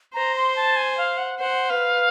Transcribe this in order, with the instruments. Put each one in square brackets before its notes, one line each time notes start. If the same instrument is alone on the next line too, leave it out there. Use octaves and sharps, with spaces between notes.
[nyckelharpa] C5 [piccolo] A#5
[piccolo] C6
A5
G#5
F5
F#5
[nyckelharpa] C5 [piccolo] F#5
[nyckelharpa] B4 [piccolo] F5